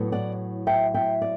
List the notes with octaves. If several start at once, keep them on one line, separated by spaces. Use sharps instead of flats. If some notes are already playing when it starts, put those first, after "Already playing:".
Already playing: A2 F#3 B3
D5 F#5
E5 G5
E5 G5
D5